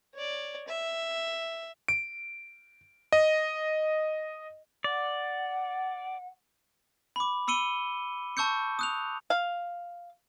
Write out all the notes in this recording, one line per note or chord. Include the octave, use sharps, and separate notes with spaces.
C#5 D5
E5
D7
D#5
D5 F#5
B5 D6
B5 E6 C#7 D#7 G7
A5 C#6 E6 G6 C#7
D#6 F#6 F7
F5